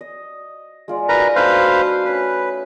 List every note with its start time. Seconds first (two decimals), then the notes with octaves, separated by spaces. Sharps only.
0.01 D#5
0.88 G#3 F4 D5
1.09 D#4 F#4 A#4 B4 A#5
1.36 A3 D4 D#4 B4 C5 F5
2.05 C#4 B4 C#5